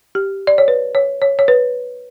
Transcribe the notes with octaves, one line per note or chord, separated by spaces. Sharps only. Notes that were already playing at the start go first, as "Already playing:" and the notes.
G4
D5
C#5
B4
C#5
C#5
C#5
B4